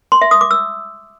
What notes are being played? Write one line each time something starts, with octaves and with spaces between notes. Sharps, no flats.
C6
E5
D#6
D6
E6